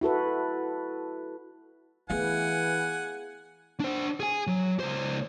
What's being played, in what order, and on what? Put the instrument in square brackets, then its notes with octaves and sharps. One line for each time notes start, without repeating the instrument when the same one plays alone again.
[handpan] E4 F#4 A4 B4
[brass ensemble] E3 [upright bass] A3 B3 [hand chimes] G#4 F5 [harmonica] F#5 G#5
[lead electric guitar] D4 C5
G#4 G#5
F#3
C#2 C5